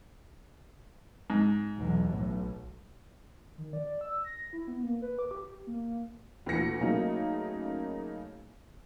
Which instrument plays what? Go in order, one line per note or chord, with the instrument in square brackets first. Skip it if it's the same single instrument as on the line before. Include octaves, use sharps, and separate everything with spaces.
[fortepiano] G#2
[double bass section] B1 E2
B1 A2
[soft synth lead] D#3
D5
E6
A#6
E4
B3
A#3
B4
D6
G4
A#3
[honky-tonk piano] D2 A#2 E3 A#6 C#7
C#3 F#3 A3 A#3 D#4